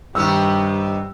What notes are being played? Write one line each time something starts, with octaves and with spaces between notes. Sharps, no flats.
G2 C3 D#3 B3 G4 E6